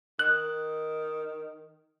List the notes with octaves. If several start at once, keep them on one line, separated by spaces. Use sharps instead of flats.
D#3 F#6